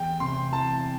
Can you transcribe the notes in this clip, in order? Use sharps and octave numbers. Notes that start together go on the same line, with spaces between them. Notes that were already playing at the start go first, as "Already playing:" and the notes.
Already playing: E2 G5
C3 C6
E3 A5